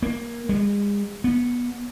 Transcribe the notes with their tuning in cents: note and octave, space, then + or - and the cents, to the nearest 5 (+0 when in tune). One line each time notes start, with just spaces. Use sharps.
A#3 +15
G#3 -40
B3 -20